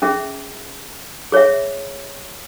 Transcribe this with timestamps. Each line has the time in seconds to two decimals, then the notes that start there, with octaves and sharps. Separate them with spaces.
0.02 C#4 G#4 E5
1.32 G#4 C#5 E5